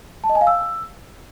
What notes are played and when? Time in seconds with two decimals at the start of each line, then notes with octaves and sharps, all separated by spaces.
0.24 A5
0.29 D#5
0.35 G#5
0.41 F5
0.47 E6